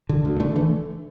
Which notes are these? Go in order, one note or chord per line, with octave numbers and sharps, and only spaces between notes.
D3
D2
D3 A3 D4
E3 A3